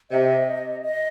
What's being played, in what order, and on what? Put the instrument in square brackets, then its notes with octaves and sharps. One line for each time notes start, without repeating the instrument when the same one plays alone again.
[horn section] C3 [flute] D#5
[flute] D#5